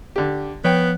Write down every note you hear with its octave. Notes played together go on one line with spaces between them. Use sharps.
D3 G4
F3 B3 C#5 G5 F#6